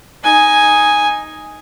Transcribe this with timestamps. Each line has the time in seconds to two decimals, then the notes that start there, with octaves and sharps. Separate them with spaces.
0.24 D#4 G#5